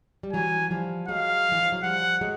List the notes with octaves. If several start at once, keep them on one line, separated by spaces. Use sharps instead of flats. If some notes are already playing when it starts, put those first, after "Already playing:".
G3
E3 F#3 G#5
F3 G3
F#3 G#3 F5
E3
F3
F#3
F3 G3 F#5
F#3 G#3